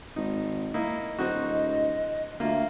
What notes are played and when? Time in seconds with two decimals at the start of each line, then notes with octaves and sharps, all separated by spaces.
0.16 G#1 D#4
0.74 A#3 D#4 E4
1.19 D1 C4 D#4 F#4
1.47 D#5
2.40 D2 A#3 F4 E5